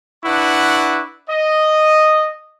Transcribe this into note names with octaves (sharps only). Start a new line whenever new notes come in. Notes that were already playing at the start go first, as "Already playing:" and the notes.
D4 E4 B4 F#5 C#6
D#5